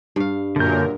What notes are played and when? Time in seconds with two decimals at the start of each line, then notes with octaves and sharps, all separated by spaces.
0.16 G2 F5
0.56 F#2 A#2 D3 A#4 G6